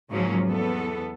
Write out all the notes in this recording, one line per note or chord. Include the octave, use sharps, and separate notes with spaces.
G#2 C#3 F3 F#3 A#3 C#4
E2 B3 A4